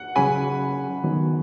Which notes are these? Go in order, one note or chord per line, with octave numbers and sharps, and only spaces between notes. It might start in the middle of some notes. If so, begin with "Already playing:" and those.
Already playing: F#5
C#3 F#3 C#4 G#4 G#5 B5
D#3 F#3 B3